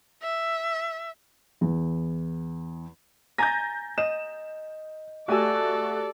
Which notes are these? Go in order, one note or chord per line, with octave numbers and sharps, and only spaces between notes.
E5
E2
G#5 A#5 G6 A6 A#6
D#5 E7
A3 F#4 G4 A4 D5 G#5 E6